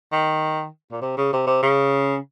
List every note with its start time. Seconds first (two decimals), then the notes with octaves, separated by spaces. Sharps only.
0.12 D#3
0.92 A#2
1.02 C3
1.17 C#3
1.33 C3
1.47 C3
1.63 C#3